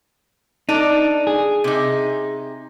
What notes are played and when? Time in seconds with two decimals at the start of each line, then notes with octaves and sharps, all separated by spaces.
0.69 D4 D#4 A4
1.27 G#4
1.64 C3 D#4